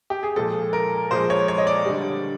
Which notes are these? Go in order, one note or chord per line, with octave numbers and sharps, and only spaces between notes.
G4
G#4
A#2 F3 G#3 A4
A#4
A#2 F3 G#3 C5
C#5
C#5
D#5
D5
D3 G3